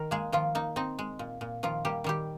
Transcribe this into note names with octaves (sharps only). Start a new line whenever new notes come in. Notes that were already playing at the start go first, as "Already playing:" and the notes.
Already playing: D#3 A#4
G#3 A#3 G#4
D#3 F3 F4
A#3 D#4
C4 D#4
G#3
A#2
A#2
D#3 F3 F4
G3 A#3 G4
D#3 G3 G4